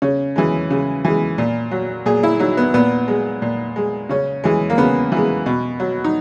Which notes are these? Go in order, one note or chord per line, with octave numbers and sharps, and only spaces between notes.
C#3 C#4
E3 G#3
C#3
E3 G#3
A#2
F#3
A#2 G#4
E4
F#3 D#4
B3
A#2 B3
G#3
A#2
G#3
C#3 C#4
E3 G#3
A#3
C#3 B3
E3 G#3
B2
F#3
D#4